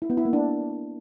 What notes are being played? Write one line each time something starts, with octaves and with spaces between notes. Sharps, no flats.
E4
B3
E4
A#3
D4